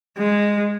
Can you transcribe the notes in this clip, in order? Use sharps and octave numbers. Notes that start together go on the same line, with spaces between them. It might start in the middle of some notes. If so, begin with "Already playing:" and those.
G#3